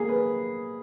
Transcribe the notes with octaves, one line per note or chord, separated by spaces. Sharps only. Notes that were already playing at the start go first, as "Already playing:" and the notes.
Already playing: A#3 G#4
B4